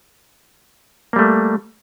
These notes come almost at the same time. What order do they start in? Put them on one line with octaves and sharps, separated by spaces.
A#3 G3 A3